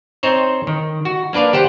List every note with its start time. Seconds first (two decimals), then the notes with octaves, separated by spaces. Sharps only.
0.23 C4 D#4 C5 C#5
0.67 D#3
1.05 F#4
1.33 A#3 D4 B4 D5 F5
1.53 G4 C5 F#5 G5